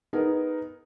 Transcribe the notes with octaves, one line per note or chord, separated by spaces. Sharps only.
B3 D#4 G#4 A#4